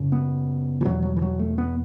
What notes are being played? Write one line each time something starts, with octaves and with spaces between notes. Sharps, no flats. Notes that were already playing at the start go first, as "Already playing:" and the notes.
Already playing: F#2 C#3
B3
E3
E2 B2 F#3
F#3
E3
F#3
A3
B3